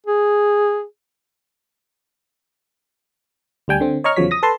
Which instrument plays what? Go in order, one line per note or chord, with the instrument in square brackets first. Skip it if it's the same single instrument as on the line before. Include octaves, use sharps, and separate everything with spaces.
[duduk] G#4
[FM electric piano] D2 G3 G5 G#5
D3 C4
C#5 D#5 A#5 C#6 F6
E2 C#3 F3 F#3 C#5 B6
D#6 A#6
A4 B4 A5 C6